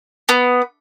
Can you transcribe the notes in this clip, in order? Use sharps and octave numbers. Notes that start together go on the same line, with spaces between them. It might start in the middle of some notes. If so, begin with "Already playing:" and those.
B3